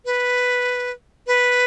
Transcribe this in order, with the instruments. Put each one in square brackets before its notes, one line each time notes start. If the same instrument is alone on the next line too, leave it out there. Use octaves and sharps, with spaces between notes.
[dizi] B4
B4